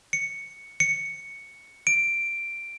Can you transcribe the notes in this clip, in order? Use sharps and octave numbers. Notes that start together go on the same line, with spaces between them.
C#7
C#7
D7